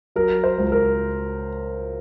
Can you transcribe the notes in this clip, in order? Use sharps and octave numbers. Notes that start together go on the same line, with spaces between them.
F#3 A#4
C5
C#2
A#4